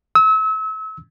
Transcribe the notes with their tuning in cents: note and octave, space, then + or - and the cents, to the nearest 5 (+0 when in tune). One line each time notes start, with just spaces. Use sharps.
E6 -35